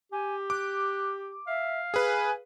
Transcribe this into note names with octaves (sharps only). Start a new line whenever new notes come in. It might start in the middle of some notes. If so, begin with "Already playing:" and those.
G4 G#5
D6 F#6
E5 F5
G#4 B4 G#5